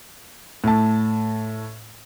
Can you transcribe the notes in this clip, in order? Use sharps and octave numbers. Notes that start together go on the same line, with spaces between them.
A2 A5